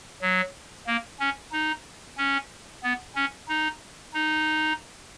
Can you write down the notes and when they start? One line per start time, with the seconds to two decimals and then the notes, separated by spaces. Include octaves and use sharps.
0.22 F#3
0.87 A#3
1.20 C#4
1.52 D#4
2.18 C#4
2.83 B3
3.15 C#4
3.48 D#4
4.14 D#4